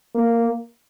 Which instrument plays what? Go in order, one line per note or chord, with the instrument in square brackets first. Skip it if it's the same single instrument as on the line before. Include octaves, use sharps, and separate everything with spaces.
[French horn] A#3